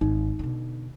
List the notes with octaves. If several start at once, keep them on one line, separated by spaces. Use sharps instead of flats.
G#1 D#4
B2 D3